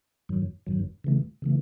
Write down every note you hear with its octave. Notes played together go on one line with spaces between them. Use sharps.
G2 D#3 F#3
G2 D#3 F#3
C#3 E3 A3
C#3 E3 A3